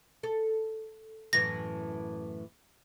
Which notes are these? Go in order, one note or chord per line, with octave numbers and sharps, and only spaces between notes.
A4
F#2 A2 E3 A#6